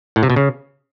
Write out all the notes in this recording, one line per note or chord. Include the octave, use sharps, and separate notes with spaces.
A2
C3
B2
C#3